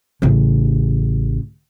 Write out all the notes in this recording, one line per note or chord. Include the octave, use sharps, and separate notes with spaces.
A1 C#3